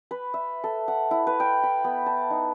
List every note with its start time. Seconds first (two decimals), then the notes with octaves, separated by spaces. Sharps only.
0.11 B4
0.34 E5
0.64 A4
0.88 F#5
1.11 E4
1.27 B4
1.40 G5
1.63 B5
1.84 B3
2.06 A5
2.30 D#4